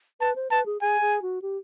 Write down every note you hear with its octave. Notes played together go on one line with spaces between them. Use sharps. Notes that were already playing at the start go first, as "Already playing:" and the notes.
B4 A5
C5
B4 A5
G#4
G#4 G#5
G#4
F#4
G4